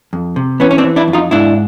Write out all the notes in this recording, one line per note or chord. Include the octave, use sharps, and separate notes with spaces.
F2
C3
E3 B3 C#4
C#4
C4 D4
E3
D4 E4
F2
D#4 F4
G#2 D4 E4